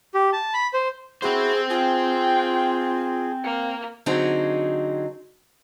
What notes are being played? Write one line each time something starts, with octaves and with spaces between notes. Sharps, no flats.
G4
A5
B5
C5
C4 E4 F#4 G#4 C5
F4 G#4 G5
A#3 F5
D3 F#3 C4 D#4 G#4